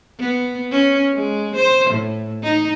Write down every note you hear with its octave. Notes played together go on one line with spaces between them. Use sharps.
B3
C#4
G#3
C5
A2
D#4